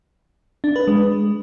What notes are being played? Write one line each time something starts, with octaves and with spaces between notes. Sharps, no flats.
D4
B4
G#3